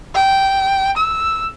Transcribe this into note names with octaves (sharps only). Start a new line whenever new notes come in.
G5
E6